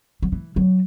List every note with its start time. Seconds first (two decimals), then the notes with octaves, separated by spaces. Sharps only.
0.22 F#3
0.32 E3
0.56 F#3